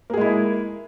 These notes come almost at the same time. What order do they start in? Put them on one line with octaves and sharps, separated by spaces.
A#3 G#4 G#3 E4